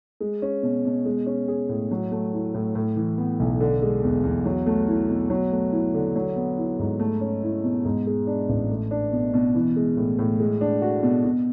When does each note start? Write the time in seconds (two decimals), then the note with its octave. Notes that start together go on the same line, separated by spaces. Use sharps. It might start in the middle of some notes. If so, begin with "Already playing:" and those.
0.20 G#3
0.42 C#4
0.63 B2
0.85 B2
1.06 G#3
1.26 C#4
1.48 G#4
1.69 A2
1.91 F#3
2.11 A3
2.33 E4
2.54 A2
2.75 A2
2.96 E3
3.18 B3
3.40 B1
3.60 D3
3.82 G#3
4.03 E2
4.24 E2
4.45 F#3
4.66 A3
4.88 E4
5.09 B2
5.30 F#3
5.51 A3
5.72 E4
5.94 D3
6.16 F#3
6.36 B3
6.58 E4
6.79 G#2
7.00 A3
7.21 C#4
7.43 E4
7.64 B2
7.85 G#2
8.07 G#3
8.27 D4
8.49 A1
8.70 A3
8.91 D4
9.12 B2
9.33 B2
9.55 E3
9.76 G#3
9.97 A2
10.19 A2
10.40 G#3
10.61 D4
10.82 F#4
11.03 B2
11.25 B2